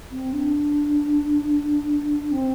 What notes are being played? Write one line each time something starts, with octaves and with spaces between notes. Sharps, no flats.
C4
D4
C4